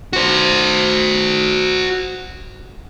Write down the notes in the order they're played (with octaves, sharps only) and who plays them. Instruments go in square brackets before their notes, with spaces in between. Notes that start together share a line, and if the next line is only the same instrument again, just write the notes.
[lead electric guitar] F#4 C5